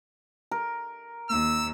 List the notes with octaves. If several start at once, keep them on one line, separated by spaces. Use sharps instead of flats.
A#4
D#2 E6